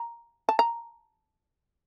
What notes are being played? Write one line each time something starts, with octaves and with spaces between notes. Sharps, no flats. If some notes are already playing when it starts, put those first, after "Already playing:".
Already playing: A#5
A5
A#5